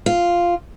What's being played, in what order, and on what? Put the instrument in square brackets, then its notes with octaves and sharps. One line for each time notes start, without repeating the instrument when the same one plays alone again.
[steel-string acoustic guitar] F4